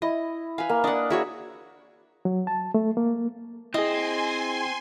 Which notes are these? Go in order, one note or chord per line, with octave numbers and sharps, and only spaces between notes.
E4 D#5
B4 F5 G#5
A#3
D4 D5 D#5 F#5
E4 F#4 G#4 C#5
F#3
A5
A3
A#3
C4 E4 G#4 D#5 G#5 C6